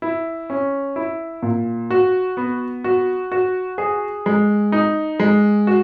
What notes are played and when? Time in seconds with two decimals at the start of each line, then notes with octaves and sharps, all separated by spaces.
0.02 E4
0.50 C#4
0.96 E4
1.43 A#2
1.90 F#4
2.37 B3
2.84 F#4
3.32 F#4
3.78 G#4
4.26 G#3
4.72 D#4
5.20 G#3
5.67 F#4